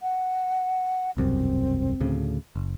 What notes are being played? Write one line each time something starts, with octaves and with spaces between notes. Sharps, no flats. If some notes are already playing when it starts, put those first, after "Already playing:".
F#5
E1 C2 F#2 C4
D2 A2 C#3
F#1